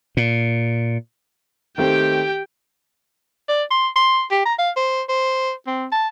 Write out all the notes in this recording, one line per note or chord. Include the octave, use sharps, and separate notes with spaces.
A#2
D#3 A3 C4 G4 G5
D5
C6
C6
G4
A#5
F5
C5
C5
C4
A5